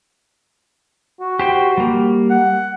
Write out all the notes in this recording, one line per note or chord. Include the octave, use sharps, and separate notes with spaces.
F#4
G4 C5 G5
G3 A#3
F#5